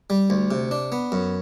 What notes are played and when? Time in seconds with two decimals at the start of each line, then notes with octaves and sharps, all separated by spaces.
0.10 G3
0.30 D2
0.51 C3
0.71 D4
0.92 B3
1.12 F#2